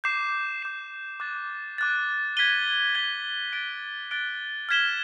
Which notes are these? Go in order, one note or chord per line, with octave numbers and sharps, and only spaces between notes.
D6 G6 C7 E7
D6 G6 C7 E7
D6 F#6 A6
D6 F#6 A6
G#6 B6 D#7 G7
G#6 B6 D#7 G7
F#6 A6 D7 G7
F#6 A6 D7 G7
F6 G#6 B6 E7 G7